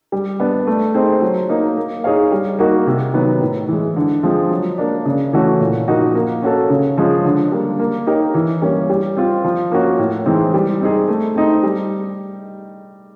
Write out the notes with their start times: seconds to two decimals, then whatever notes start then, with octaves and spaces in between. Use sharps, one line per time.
0.12 G3
0.40 B3 D4
0.67 A3
0.95 C4 D#4 G#4 C5
1.22 F#3
1.49 A#3 D#4
1.77 A#3
2.04 D#4 G#4 C#5 F5
2.32 G3
2.59 A#3 D#4 F#4 A#4
2.87 C3
3.13 D#3 F#3 B3
3.41 A2
3.68 E3 G#3
3.96 D3
4.23 F3 G#3 C4
4.51 F#3
4.78 A#3 D4
5.05 C#3
5.33 E3 A3 C#4 F#4
5.60 A#2
5.87 F3 A#3 D#4 F#4
6.15 A#3
6.42 C#4 F#4 A4
6.70 C#3
6.98 F3 G#3 C#4
7.25 D3
7.52 G3 A#3
7.79 A#3
8.07 D#4 G4 A#4 C#5
8.34 E3
8.62 G3 A#3 C#4
8.90 G3
9.17 C4 F4
9.44 F3
9.71 A#3 C#4 F#4
9.99 A2
10.26 E3 G#3 C4 D#4
10.54 G3
10.81 C4 D#4 G#4
11.08 A3
11.36 C4 D#4
11.63 G3